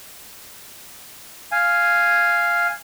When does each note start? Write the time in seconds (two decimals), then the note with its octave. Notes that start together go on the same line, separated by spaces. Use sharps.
1.52 F5 G#5